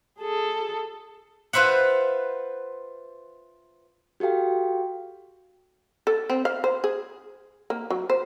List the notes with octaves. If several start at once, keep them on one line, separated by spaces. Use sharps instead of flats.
G#4 A4
F4 B4 C5 E5 F#5
F#4 G4 A4 F5 G5
A4
C4
F5
C5
G#4
A#3
F#3
C5